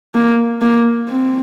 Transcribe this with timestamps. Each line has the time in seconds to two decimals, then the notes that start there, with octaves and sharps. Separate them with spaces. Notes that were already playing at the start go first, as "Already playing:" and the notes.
0.15 A#3
0.61 A#3
1.09 C4